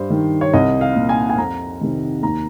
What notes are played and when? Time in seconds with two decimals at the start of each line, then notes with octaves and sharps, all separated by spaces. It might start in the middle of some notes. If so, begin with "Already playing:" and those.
Already playing: G2 C5
0.10 D#3
0.41 C#5
0.53 C2 D#5
0.81 F5
0.95 A#2
1.09 G#5
1.29 G#5
1.38 F2 A#5
1.81 C3 D#3
2.22 D#2 A#5